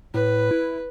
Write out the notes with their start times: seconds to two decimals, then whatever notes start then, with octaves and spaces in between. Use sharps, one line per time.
0.14 A2 B4
0.51 E4